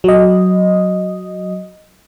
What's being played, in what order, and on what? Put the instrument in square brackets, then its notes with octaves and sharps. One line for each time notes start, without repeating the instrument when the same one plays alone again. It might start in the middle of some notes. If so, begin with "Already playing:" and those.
[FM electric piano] F#3 D#5